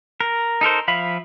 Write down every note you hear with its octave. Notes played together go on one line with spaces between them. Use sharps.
A#4
D#4 A4 A#4 C5
F3 E5 F5 B5